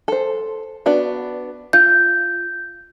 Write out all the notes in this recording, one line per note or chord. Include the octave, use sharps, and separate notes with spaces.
A4 C5
B3 D4 F#4
F4 G6